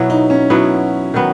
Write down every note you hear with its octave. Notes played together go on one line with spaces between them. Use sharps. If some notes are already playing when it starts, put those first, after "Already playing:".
Already playing: B2 F#3 B3 E4
D#4
C#4
B2 F#3 B3 E4
D#3 F#3 B3